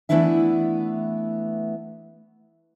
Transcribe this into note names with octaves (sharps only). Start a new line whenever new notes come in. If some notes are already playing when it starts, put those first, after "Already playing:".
E3 A3 B3 D4 E4 E5